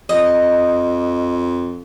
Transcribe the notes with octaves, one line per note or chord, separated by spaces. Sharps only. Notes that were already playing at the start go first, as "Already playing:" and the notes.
F2 D#5